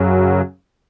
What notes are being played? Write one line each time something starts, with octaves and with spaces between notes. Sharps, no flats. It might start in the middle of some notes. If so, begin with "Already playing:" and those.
Already playing: F#2 C#3 F#3